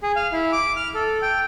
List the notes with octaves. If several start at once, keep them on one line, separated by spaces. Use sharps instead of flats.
G#4
F5
E4
D6
F6
A4
G5